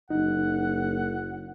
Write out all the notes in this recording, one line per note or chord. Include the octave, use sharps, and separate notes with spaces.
F#1 D#4 F#5